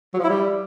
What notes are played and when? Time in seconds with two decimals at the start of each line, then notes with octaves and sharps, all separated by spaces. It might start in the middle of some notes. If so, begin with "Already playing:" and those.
0.14 F#3
0.19 F3
0.24 E4
0.29 G3